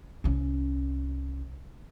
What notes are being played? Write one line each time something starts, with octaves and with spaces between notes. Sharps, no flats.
C2 C#4